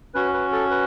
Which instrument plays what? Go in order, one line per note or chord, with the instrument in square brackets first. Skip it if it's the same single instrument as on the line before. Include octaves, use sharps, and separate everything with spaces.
[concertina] C#4 F#4 B4
B4
A4
B4